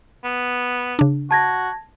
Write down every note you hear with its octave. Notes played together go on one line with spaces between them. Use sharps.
B3
C#3 D4
F#4 A5 G#6 A#6